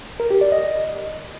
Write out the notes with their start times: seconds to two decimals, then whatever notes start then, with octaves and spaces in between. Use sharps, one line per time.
0.20 A#4
0.30 G4
0.41 D5
0.52 D#5